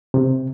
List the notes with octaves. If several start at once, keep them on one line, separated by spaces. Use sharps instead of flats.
C3